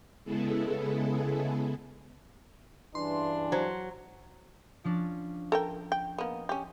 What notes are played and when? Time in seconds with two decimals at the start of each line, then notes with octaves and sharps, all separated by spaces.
0.24 C#3 G#3 B3 E4 G#4 A4
2.95 G2 C#3 E3 D4 C6
3.52 F#3 C5
4.84 F3 C#4 D4
5.52 A4 A#4 G5
5.92 G5
6.18 A#3 B3 D#5
6.49 C#4 G4